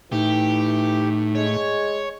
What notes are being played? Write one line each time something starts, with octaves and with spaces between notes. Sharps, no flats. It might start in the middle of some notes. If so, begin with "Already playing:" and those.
A2 E3 D#4 G4
G#3 C#5